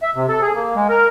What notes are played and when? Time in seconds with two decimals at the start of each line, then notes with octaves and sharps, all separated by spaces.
0.02 E5
0.16 C3
0.29 A4
0.42 G#4
0.55 A#3
0.76 G#3
0.89 A#4